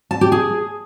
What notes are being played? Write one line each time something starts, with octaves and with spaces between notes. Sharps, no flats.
A5
G4
G#4